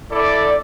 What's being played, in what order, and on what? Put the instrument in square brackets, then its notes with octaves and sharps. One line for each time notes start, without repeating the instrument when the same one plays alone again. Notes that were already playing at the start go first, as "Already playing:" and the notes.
[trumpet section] E4 A4 D5